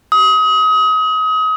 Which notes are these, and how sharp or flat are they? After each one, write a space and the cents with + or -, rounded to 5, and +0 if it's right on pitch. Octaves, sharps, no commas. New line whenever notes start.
D#6 +30